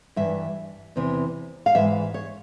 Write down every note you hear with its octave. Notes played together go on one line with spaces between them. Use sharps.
G2 E3 E5
E2 C3 E3
F5
G#2 E3 E5
C#5